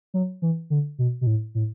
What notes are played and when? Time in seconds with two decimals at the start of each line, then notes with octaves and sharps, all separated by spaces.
0.14 F#3
0.42 E3
0.70 D3
0.99 B2
1.21 B2
1.27 A2
1.55 A2